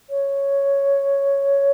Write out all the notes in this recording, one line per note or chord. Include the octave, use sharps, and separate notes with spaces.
C#5